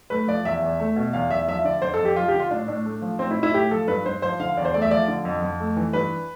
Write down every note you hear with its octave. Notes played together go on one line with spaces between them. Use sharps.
A3 B4
F3 D5
E2 E5
E2
A3
B2
E2 F5
E2 E5
F3 E5
D3 D5
F2 C5
A4
F2
G4
F3 F4
G4
D3
F4
A2 D4
A2 D4
A3
F3
A2 C4
E4
A2
E4
A3 G4
F3 A4
G2 B4
G2 C5
F3 C5
D3 F5
E2 D5
C5
A3 D5
E5
F3 D5
D3
F2
F2
A3
E3
G2 B4